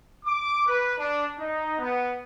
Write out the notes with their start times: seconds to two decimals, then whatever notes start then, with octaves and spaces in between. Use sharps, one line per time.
0.24 D6
0.66 B4
0.98 D4
1.37 D#4
1.78 B3